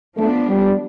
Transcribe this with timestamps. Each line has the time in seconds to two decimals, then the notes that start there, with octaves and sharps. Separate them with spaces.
0.17 F3 A3 B3 D4
0.47 G3